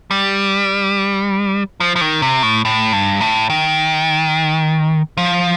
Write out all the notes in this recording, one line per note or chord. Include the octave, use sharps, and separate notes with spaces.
G3
F3
F3
D#3
C3
A2
A2
G2
A2
D#3
F3